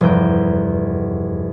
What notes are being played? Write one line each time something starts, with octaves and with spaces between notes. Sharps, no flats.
F1 E2 G2 A#5 G6 D7